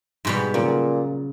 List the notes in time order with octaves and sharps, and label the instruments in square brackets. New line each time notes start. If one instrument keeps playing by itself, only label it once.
[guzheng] G#2 B2 G3
[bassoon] A#2 [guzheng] C#3 F#3